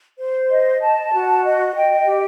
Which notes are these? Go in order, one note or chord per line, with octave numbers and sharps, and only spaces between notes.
C5
D#5
A5
F#4
D#5
G5
G4